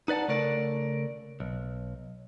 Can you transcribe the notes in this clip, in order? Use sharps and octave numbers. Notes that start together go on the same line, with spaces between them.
D#4 B4 D5 F#5 A5
C#3 A3 A#4 D5
B1